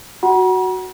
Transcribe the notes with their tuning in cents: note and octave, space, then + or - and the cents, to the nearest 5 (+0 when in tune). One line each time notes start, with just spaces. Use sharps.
F#4 +0 F#5 +20 A#5 +45